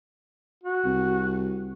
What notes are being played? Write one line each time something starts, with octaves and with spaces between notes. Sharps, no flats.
F#4
C2